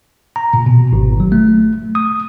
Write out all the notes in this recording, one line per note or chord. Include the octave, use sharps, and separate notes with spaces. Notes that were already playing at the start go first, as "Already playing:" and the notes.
A#5
A#2
B2
G#1
F#3
A3
D#6